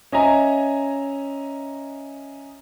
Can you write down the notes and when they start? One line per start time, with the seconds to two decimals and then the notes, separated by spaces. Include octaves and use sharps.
0.12 C#4 D#5 E5 G#5 A#5